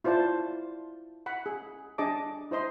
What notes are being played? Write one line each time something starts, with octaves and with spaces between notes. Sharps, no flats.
E4 F4 C5 D5 A5
F#5 B5
G#4
D4 G#4 D#5 A5 D6
E4 C5 D#5 C6 D#6